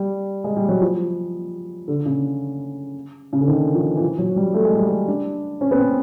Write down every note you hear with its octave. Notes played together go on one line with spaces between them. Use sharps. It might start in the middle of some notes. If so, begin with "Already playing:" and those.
Already playing: G3
G#3
G3
F#3
F3
D3
C#3
C#3
D3
D#3
F3
E3
F3
F#3
G3
A3
G#3
G3
G#3
D4
C#4
B3
C4